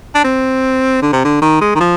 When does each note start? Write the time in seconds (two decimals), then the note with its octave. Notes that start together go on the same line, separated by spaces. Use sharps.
0.15 D4
0.24 C4
1.02 D3
1.13 C3
1.24 D3
1.42 D#3
1.61 G#3
1.75 D#3
1.80 F3